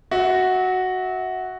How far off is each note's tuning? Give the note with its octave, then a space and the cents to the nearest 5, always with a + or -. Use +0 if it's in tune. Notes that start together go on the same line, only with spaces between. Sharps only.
F#4 +0 E5 -30